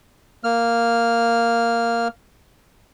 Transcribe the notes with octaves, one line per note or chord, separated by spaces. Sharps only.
A#3 F6